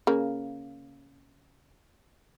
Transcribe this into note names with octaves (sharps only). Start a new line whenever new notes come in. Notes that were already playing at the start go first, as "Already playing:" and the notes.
C#3 A#3